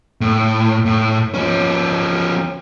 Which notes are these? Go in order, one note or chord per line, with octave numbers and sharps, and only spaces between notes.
A2
A2
F3 C#4